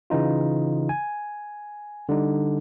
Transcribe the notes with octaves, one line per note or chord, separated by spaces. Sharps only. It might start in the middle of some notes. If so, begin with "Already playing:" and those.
C#3 E3 D#4 F4
G#5
D3 G3 D#4